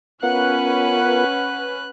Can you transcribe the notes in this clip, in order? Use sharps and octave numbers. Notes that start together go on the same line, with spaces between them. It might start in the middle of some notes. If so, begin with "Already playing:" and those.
B3 C#4 F4 A#4 B4 F#5 F#6